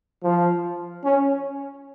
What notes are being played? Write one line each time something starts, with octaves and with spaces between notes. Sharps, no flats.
F3
C#4